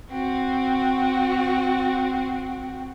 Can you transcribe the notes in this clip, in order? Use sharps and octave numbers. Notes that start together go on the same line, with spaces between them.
C4 F#4